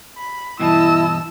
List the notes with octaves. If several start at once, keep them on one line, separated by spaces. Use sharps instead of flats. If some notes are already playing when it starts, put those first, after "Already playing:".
B5
G2 B2 E3 E4 D#5 A5 E6